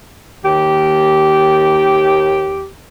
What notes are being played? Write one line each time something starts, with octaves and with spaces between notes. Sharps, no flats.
D#2 G4